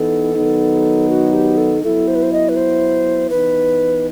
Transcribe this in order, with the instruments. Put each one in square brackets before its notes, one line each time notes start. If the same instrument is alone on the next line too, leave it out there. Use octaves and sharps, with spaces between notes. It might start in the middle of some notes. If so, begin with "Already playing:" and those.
Already playing: [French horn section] E3 B3 D#4 [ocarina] A4
[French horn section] D#3 F#3 B3 D#4
[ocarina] F#4
G4
A4
[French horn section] F#3 B3 E4 [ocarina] A4
[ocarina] C5
B4
C5
D#5
B4
C5
[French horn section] E3 B3 D#4 [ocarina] B4